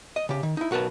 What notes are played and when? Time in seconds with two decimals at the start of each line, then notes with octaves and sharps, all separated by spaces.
0.16 D#5
0.29 C#3 G4
0.43 D#3
0.57 D#4 E4
0.71 B1 F#4 A#4 B4 A5